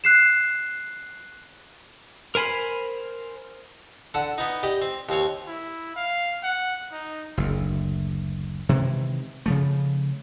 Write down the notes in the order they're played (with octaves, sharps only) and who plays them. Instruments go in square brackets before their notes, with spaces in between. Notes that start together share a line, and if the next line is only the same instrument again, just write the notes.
[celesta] F#6 C7 E7
[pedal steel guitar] A#4 C5 G#5 B5 C6
[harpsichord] D3 A4 F#5
B3 D#4
G4 D5 D#5
C4
D#2 C4 C#5
[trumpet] E4
F5
F#5
D#4
[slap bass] F#1 D2
C3 D#3 E3 G#3
C#3 F3 A3